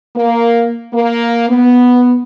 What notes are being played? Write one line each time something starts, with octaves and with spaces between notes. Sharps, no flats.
A#3
A#3
B3